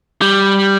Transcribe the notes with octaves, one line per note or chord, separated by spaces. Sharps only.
G3